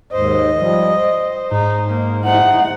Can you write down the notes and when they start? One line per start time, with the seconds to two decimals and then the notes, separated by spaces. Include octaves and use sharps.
0.13 D#2 G#2 C5 D#5
0.58 F3 G3
0.96 C5
1.51 G#2 D#4
1.89 A#3
2.25 D#4 E4 C5 F#5